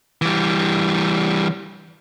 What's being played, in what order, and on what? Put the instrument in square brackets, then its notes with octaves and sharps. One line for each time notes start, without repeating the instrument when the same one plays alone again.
[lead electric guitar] E3 G3